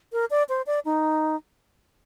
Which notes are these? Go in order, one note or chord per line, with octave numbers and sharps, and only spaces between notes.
A#4
D5
C5
D5
D#4